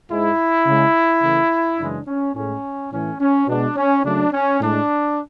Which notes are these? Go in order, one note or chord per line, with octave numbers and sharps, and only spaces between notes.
G#2 G#3 E4
C#3 G#3
C#3 E3 A3
F#2 C#3 E3 G#3 D4
C#4
A2 G#3 C#4
A2 E3 A3 C#4
C#4
B2 G#3 D4
C#4
C#3 F#3 A3 D4
C#4
A2 G#3 D4